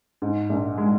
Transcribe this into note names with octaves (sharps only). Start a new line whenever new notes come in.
G#2
A#1
G#3